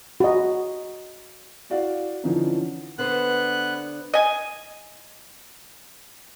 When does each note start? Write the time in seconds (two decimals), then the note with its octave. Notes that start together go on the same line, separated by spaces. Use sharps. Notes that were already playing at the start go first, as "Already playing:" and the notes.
0.20 F#4 D#5
1.70 E4 F#4 D5 F5 F#5
2.24 D3 E3 F3 C#4 D#4
2.99 D3 B3 B4 C5 F#6
4.14 D#5 G#5